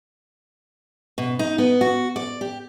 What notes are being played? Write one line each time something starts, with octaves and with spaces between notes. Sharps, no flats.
B2
D#4
B3
F#4
D5
G4